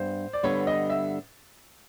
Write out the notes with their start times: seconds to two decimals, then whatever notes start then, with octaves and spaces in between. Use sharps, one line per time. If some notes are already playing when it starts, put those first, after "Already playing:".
Already playing: G2 B3 C5
0.33 D5
0.43 G2 D3 G3 B3 C#5
0.67 D#5
0.90 E5